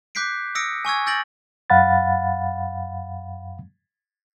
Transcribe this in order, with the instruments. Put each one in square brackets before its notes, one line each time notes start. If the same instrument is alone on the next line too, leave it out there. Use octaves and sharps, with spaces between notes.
[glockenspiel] D6 F#6 G6 B6 C7 D7
D#6 E6 A#6 C#7 D7
G#5 C#6 E6 G#6
E6 G6 A6 A#6 D7 F#7
[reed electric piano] F#2 F5 F#5 B5 A6